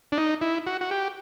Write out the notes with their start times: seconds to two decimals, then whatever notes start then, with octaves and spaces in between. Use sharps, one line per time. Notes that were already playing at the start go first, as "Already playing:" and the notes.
0.12 D4
0.17 D#4
0.41 E4
0.67 F#4
0.81 F#4
0.91 G4